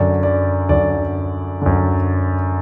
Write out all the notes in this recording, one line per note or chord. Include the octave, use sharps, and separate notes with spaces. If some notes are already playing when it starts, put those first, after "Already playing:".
Already playing: F#2 D3 D5
D5
F#2 D3 D5
F#2 D3